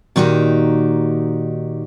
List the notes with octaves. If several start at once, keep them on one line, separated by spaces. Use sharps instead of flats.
A#2 D#3 D#4 F#4 G4